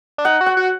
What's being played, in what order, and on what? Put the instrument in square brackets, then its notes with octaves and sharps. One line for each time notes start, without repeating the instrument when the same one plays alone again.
[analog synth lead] D4
[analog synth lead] D#4 [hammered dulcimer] F#5
[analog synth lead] F#4
[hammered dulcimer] F#5
[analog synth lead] F#4